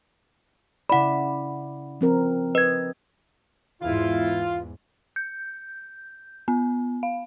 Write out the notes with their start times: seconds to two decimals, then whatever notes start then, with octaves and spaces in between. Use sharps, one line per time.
0.90 C#3 E4 D5 F#5 B5
2.01 F3 C4 A#4
2.55 B4 D#5 G#6
3.82 E2 G#2 E4 F4 F5
5.16 G6
6.48 B3
7.03 F5